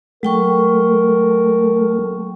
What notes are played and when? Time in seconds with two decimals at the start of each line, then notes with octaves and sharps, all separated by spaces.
0.23 F#3 A3 A#4 G5 C#6